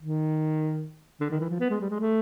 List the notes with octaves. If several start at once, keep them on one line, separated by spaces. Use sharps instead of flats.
D#3
D3
D#3
E3
F3
B3
G#3
G3
G#3
A3